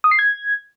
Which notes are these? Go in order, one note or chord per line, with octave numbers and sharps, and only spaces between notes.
D#6
C7
G#6